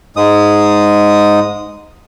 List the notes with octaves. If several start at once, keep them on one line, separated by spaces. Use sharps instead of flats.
G#2 G#3 D#6